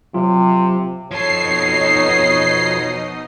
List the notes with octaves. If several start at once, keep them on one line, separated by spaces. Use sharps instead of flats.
C3 F#3 F4
B2 F3 D#4 A4 C#5 D#5 C7